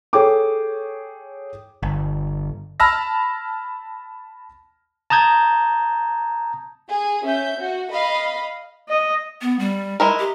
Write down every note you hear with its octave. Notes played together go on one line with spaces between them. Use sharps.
G#4 A4 C#5 G5 D6
G1
A5 B5 E6 F6 A#6
A5 A#5 D#6 G6 G#6
G#4
C#4 E5 G6
F#4
D#5 F5 B5
D#5
B3
G3
G#3 E4 A#4
G4